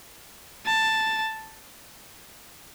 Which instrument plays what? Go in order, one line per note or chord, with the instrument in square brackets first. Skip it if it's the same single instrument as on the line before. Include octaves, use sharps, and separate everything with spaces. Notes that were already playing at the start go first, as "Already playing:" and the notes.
[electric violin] A5